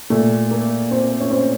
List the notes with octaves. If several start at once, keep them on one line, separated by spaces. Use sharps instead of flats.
A#2 A3
A#3
C4
C#4
C4